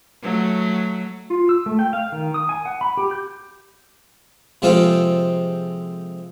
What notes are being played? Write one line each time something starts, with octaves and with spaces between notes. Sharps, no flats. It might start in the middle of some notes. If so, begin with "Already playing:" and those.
F#3 A3
F4
E6
A3
G5
F5
D#3
D#6
G#5
F#5
B5
G4
G6
C3 F3 G#3 C4 F4 A4